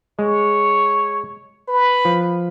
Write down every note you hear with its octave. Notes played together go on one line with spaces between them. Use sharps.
G#3 C#5
B4
F3